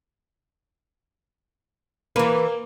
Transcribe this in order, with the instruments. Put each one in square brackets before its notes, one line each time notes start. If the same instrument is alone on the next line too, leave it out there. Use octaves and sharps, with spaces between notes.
[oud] E3 B4 [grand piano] A#3